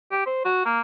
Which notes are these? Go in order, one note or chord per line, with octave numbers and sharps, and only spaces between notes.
G4
C5
F#4
A#3